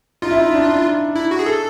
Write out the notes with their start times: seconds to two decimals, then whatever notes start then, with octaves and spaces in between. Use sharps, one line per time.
0.22 D#4 F4
0.31 E4
0.37 D#4
0.53 D4
0.68 D4
1.16 E4
1.31 F#4
1.39 G#4
1.46 A4